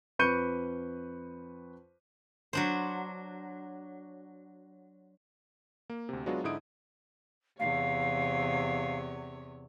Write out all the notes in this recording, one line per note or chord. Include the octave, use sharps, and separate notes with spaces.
F2 B4 C#6 G6 C#7 D#7
F#3 D4 C5
A#3
D2 C3
F#3 G#3 B3 D4 F4 F#4
G#2 D3 D#4 E4 D#6 D7
E2 C3 C#5 F5